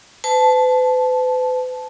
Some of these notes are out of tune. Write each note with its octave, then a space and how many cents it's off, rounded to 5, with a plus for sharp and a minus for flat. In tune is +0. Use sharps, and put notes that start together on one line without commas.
B4 +45 A5 -15